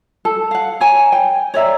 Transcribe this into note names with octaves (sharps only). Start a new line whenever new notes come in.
A4
F5 F#5
C#5 G#5 A#5
G5
C#5 D5 E5 A#5